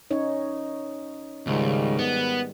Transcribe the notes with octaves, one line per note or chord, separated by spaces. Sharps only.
C#4 D#4 C#5
C#2 G#2 D#3 G3
B3